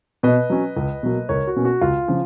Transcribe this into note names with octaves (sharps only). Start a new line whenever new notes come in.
B2 B4 D#5
F#3 C#4
C#2
B2 F#3 A#3
C#2 A#4 C#5
F#4
B2 A#3 C#4
F#4
C#2 F4
C#3 F3